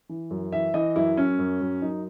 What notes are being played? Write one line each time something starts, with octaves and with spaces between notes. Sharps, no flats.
E3
F#2
E3 E5
E3 D#5
F#2 E4
F#2 C#4
F#2
F#2
F#2 D#4